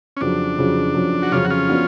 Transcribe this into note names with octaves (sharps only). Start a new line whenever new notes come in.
C#4
F2 C#3 F#3 D4
F2 C#3 F#3
F2 C#3 F#3
F#4
F2 C#3 F#3 C#4 F4
F#4
C#4 F4
F3 B3 D4 F#4